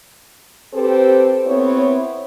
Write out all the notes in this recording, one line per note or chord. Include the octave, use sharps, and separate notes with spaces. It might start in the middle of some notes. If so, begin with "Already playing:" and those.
C4 G4 A4 B4 C5
B3 C4 E4 C#5